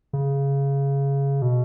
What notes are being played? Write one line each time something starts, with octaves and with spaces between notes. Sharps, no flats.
C#3
B2